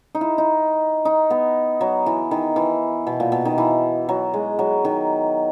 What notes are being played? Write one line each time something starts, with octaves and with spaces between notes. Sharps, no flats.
D#4
E4
D#4
D#4
B3
F#3
E3
D#3
E3
B2
A#2
B2
D#3
E3
F#3
G#3
F#3
D#3